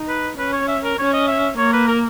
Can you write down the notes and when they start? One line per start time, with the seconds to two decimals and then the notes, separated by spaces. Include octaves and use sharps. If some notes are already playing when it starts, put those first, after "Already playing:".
Already playing: D#4
0.09 B4
0.38 C#4 B4
0.53 C#5
0.68 E5
0.84 A#4
0.98 C#4 C#5
1.13 D#5
1.28 E5
1.58 A#3 C#5
1.73 B4
1.88 A#4